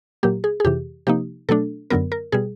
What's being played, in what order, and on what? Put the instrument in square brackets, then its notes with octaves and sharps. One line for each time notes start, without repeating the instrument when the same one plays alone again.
[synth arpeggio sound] A#2 F#3 A#3 G4
G#4
G#4
F2 C3 E3 G4
C3 F3 A#3 D#4 G4
B2 F#3 A3 D4 A4
F#2 D3 F#3 B3 A#4
A#4
B2 G3 G#4